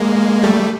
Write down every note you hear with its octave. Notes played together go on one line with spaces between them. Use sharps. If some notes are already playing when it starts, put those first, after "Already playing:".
Already playing: G#3 A#3
G3 A3